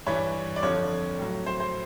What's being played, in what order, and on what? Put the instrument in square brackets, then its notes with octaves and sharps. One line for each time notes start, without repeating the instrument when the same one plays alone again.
[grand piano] G2 E3 G3 C#5
D5
F2 D3 F3 C#5
A2 F#3
C5
C5